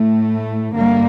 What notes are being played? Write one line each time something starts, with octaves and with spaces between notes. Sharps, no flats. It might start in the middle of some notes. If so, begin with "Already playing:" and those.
Already playing: A2 A3
G2 D3 G3 A#3